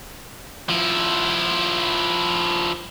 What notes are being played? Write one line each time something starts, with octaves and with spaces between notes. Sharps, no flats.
F3 E4